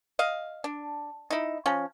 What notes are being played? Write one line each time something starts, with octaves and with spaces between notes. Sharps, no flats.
D#5 F5
D4
D#4 E4
F3 C#4